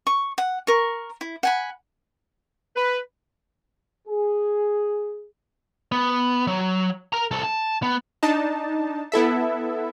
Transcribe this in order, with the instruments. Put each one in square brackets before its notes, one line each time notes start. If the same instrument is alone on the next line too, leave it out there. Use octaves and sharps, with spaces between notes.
[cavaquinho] C#6
F#5
A#4 C#6
E4
F#5 G#5 B5
[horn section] B4
[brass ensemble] G#4
[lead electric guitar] B3
F#3
A#4 A#5
C2 A4
A5
B3
[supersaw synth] D4 D#4 A5
B3 E4 A4 E5